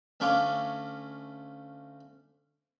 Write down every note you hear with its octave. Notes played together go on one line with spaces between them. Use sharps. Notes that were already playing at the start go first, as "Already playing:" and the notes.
D2 A3 C#4 F4 D6